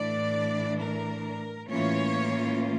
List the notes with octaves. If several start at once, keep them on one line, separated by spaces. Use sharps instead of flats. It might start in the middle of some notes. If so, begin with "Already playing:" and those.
Already playing: A2 E3 A3 D4 D5
A#4
A2 E3 A#3 C#4 F4 C#5